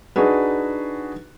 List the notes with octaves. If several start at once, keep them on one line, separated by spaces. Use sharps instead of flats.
D4 D#4 F#4 G#4 B4